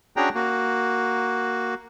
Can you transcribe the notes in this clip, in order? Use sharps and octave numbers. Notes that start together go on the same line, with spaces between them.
C#4 D4 F#4 G#4 G5 A#5
A#3 F#4